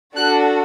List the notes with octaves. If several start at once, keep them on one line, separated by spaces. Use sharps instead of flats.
D4 F#4 A4 F#6